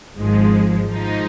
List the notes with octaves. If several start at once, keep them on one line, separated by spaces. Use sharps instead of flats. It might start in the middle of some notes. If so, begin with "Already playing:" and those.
G#1 G#2 F3 G#3
G#2 F3 G#3 D#4